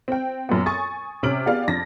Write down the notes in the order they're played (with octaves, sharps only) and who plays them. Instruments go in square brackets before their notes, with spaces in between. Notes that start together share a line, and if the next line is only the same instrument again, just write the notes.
[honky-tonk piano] C4 G5
F#2 A#2 B3
G#5 C#6 D#6 A6
C3 C#4 F6 D7 F#7
B3 G4 G#4 D5 F5
F2 D4 A6 A#6